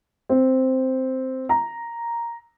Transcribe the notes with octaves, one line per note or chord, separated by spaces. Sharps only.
C4
A#5